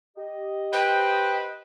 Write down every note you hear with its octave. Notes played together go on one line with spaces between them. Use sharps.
G4 D#5
B4 C5 G5